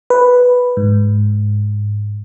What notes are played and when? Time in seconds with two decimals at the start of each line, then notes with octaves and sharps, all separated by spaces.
0.10 B4
0.77 G#2